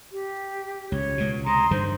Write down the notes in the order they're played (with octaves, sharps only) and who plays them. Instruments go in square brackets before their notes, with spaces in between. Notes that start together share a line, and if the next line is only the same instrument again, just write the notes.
[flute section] G4
[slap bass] C#2 [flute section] C#5
[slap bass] C#2 B2
[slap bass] C3 [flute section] A#5 C6 D#6
[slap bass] G2 D3 D#3 [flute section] C5